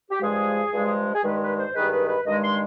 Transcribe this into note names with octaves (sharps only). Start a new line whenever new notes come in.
G4
G2 F3 G#3 G#4
G2 F3 G#3
G#4
G2 D#3 G#3 B4
B4
C5
G2 D#3 G#3 B4
B4
B4
G2 D#3 G#3 D#5
C6